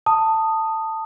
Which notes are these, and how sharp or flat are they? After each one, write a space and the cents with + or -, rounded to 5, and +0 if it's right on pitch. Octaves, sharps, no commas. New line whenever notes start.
A5 +15 D#6 -5